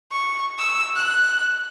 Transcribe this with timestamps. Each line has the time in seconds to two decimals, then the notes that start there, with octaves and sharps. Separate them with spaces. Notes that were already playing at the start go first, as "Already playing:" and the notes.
0.11 C#6
0.59 E6
0.96 F#6